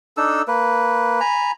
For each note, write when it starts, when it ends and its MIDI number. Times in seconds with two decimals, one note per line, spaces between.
0.17 0.42 62
0.17 0.42 63
0.17 0.42 69
0.17 0.42 88
0.48 1.20 58
0.48 1.20 71
1.20 1.51 80
1.20 1.51 82
1.20 1.51 83